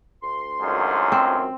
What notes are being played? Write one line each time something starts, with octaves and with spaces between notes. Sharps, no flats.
D2 C6
G#1 C#2 F#2
C4